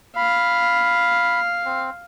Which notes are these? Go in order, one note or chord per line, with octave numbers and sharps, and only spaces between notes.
F5 B5
C4